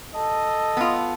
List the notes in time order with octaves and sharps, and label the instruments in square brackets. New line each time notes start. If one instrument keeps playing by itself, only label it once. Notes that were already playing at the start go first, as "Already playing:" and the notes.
[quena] A4 [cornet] D#5 [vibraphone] A5
[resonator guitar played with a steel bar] B3 F4